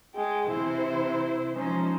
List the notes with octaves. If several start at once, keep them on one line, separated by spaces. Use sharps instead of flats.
G#3 G5
C3 E3 E4 C5
F3 G#3 C#4 D#4 C5